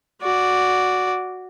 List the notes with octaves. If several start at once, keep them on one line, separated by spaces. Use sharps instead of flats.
F#4 D5